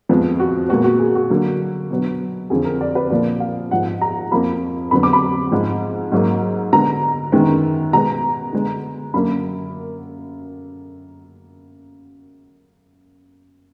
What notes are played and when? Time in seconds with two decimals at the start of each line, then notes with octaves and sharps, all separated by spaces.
0.09 F2 F3 G#3 B3
0.40 F#4
0.69 A#2 G#3 B3 F#4
0.84 F#4
1.00 G#4
1.15 F#4
1.30 D3 F#3 A#3
1.91 B2 F#3 B3
2.50 F2 D3 F3 G#4
2.65 A#4
2.81 D5
2.95 B4
3.10 A#2 F3 A#3 D5
3.40 F5
3.71 G#2 F3 B3 F#5
4.01 A#5
4.32 F2 F3 A#3 B5
4.91 F2 D3 F#3 B3 B5
5.03 D6
5.13 B5
5.51 G#2 F3 G#3
6.12 G#2 F#3 A#3
6.72 D3 G#3 B3 A#5
7.32 F#2 D#3 G#3 B3
7.92 B2 G#3 B3 A#5
8.53 D3 G#3 B3
9.14 F#2 D3 F#3 A#3 B5